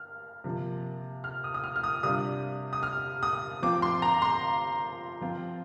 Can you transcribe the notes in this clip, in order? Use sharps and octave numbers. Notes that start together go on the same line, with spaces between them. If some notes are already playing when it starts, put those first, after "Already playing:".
Already playing: F6
C3 F3 A#3
F6
D#6
D#6
F6
F6
D#6
C3 G3 D4 F4 D#6
D#6
F6
D#6
F3 C4 F4 D6
C6
A#5
C6
F3 C4 F4